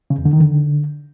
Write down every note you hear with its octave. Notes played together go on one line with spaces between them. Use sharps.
C#3
E2
D3
D#3
D3